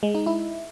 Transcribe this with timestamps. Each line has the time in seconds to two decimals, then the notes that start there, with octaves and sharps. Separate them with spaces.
0.03 G#3
0.15 D#4
0.26 E4